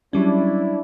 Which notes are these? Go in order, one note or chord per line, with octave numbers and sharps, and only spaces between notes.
F#3 G3 C#4 D4 E4